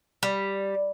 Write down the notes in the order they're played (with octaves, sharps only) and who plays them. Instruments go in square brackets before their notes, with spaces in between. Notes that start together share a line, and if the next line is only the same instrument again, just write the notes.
[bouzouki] G3